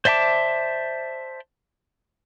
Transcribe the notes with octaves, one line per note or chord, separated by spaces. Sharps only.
C5 D5 E5 A5 D6